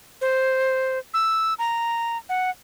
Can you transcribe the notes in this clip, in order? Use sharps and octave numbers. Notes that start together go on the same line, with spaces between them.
C5
E6
A#5
F#5